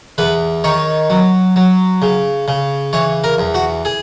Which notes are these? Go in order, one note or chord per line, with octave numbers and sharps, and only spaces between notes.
E2 B4
D#3 C#5
F#3
F#3
C#3
C#3
E3 C#5
A#4
E2
F#4
G#4